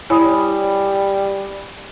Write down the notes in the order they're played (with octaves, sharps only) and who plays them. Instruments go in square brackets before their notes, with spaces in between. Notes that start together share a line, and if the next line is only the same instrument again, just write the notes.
[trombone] G3 [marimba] E4 C#5 [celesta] G#5 B5 D#6